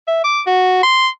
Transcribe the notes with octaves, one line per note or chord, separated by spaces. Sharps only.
E5
D6
F#4
C6